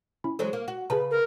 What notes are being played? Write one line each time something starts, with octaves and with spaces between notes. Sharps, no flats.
C#4 E4 B5
E3 F#3 G#3 A4 C5
A#3
F#4
C#3 G#4 B4 A5 A#5
A#4